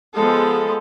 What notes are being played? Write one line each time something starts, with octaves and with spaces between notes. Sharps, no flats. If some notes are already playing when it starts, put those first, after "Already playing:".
F3 G#3 B3 A4